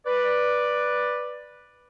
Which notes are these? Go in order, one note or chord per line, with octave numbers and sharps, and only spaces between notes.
B4 D5